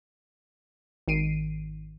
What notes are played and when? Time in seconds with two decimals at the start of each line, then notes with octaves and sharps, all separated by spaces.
1.08 G#1 D#3 C7 D7 D#7